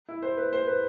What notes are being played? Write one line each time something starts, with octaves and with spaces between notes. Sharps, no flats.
E4
C5
B4
C5
B4